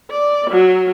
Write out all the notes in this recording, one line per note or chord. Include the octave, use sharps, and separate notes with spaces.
D5
F#3